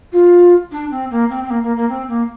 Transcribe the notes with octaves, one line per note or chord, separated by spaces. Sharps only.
F4
D4
C4
A#3
C4
C4
A#3
A#3
A#3
C4
A#3